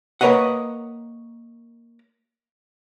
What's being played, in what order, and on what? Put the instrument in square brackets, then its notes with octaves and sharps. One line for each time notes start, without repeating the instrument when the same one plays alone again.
[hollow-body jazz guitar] A#3 A#4 B4 C#5 D#5 F#5